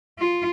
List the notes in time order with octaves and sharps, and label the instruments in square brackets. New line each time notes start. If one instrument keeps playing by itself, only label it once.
[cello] F4